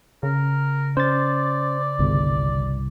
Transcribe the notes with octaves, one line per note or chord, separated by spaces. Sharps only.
C#3 A#4
C#4 C5 D5 A6
G1 C2